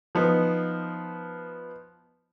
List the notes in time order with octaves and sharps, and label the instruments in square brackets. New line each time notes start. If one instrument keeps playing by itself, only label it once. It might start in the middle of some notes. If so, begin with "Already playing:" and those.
[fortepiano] F3 B3 D#4